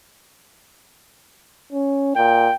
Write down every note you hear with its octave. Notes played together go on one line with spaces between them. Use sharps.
C#4
A#2 G5